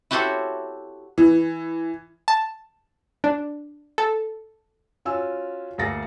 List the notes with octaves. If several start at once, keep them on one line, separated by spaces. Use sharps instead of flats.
E4 F#4 G4 A4 C5 C#5
E3
A5
D4
A4
C#4 F4 F#4 G#5 E6
D2 A#3 G#4 A6 A#6 C#7